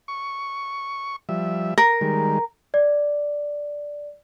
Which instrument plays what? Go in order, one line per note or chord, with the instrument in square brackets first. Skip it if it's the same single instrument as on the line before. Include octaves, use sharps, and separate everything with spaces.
[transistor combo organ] C#6
F3 G3 E5
[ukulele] A#4
[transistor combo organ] D#3 G3 G#3
[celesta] D5